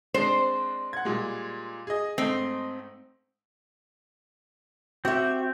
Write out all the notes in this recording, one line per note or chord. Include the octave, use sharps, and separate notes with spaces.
G#3 C4 D4 C5
F#5 G#6
A#2 G3 G#3
G#4 D#5
G#2 A3 C4 D#5
C4 F#4 G4 E5